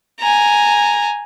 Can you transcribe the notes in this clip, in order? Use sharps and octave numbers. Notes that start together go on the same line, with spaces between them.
G#5 A#5